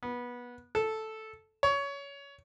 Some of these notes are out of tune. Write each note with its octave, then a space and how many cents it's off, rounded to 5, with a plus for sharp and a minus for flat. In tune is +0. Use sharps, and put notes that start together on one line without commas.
B3 -20
A4 -5
C#5 +20